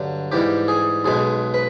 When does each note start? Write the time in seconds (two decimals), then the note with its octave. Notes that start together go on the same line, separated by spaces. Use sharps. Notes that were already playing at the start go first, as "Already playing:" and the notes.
Already playing: G2 D3 F#3
0.32 G#2 E3 G3 G4
0.68 G#4
1.04 B1 B2 G#3 G#4
1.54 B4